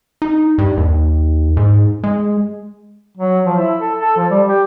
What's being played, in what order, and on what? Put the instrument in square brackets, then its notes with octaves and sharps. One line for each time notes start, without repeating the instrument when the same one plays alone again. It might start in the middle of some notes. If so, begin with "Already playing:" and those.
[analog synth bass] D#4
G2
D#2
G#2
G#3
[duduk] F#3
F3
E4
A4
A4
F3
G3
G4